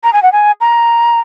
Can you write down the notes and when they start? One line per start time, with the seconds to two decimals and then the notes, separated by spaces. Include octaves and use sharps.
0.04 A#5
0.13 G#5
0.23 F#5
0.32 G#5
0.61 A#5